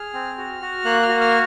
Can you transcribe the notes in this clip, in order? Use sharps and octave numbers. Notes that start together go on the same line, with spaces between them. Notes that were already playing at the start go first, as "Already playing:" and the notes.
Already playing: G#4 F6
C4
F#4
F#4
A#3 F#6
F6
F#4
F6